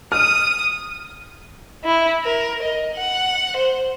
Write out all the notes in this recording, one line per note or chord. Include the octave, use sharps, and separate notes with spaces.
D#6 F6 D#7
E4
A#4
D#5
F#5
C5